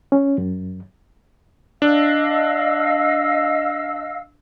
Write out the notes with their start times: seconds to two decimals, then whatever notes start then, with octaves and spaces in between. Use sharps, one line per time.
0.12 C#4
0.38 F#2
1.82 D4 D#5 F5 E6